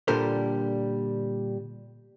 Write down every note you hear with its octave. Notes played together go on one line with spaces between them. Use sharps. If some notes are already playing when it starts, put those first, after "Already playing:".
A#2 D3 G3 A4 A#4 C5